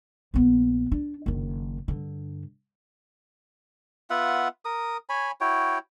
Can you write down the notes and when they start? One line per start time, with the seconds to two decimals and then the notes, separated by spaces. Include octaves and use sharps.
0.34 A#1 B3
0.92 D4
1.26 F#1 D#3
1.88 G2 D3
4.10 B3 F4 E5 F#5
4.65 A#4 D#6
5.09 C#5 G#5 B5
5.41 E4 F#4 C#5 G5